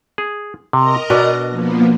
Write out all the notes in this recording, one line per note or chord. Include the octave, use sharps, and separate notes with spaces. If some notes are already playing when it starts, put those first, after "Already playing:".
G#4
C3 A#4 D#5 A#5
B2 D4 B4
F3 A#3 B3